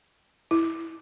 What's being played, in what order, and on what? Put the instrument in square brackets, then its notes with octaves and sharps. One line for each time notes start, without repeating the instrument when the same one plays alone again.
[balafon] E4